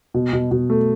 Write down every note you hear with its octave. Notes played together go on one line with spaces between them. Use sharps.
B2
B2
B2
A3